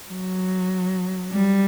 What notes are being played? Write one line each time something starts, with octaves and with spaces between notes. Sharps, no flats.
F#3
G3